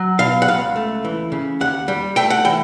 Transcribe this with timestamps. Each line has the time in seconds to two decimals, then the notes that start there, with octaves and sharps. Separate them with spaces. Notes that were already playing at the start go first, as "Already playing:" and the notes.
Already playing: F#3
0.19 B2 F5
0.42 F#5
0.48 C#2 F5
0.76 A3
1.05 E3
1.32 C#3
1.61 D#2 F#5
1.88 G3
2.16 A3 G5
2.30 F#5
2.45 E3 G5